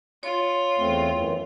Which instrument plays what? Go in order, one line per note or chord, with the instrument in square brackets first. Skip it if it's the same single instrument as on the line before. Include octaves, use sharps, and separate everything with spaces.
[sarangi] F4 [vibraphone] C#5
[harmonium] E2 A3 C4
F#2 E3